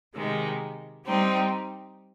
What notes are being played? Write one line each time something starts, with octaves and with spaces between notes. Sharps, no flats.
C3 D#3 G#3
G3 C4 D#4